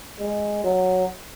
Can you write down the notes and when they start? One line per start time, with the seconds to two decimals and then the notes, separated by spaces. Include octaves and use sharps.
0.19 G#3
0.64 F#3